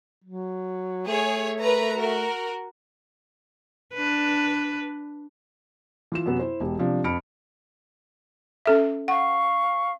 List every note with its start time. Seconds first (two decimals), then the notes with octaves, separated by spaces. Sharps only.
0.24 F#3
1.07 A3 G#4 C#5
1.60 A#4 B4 A#5
1.96 F#4 A#4
3.94 D4 B4
6.12 E3 F4 E7
6.26 F#2 C3 B3
6.39 E4 C5
6.60 E1 G4
6.79 C3 F3 D4
7.04 F2 B5 F6 C#7 D7
8.66 C#4 A4 E5
9.08 F5 F#5 C#6